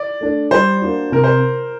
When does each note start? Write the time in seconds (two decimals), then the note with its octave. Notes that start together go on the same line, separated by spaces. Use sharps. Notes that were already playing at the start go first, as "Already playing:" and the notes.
Already playing: D5
0.21 A3 D4
0.51 G3 C5
0.82 A#3 D4 F#4
1.12 C3 A#4
1.24 C5